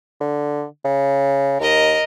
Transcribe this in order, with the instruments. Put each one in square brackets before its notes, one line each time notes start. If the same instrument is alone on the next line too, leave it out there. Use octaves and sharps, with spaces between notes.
[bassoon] D3
C#3
[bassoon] D#2 [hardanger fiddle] A#4 D#5